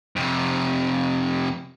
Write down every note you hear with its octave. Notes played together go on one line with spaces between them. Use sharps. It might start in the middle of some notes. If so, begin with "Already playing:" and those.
F2 C3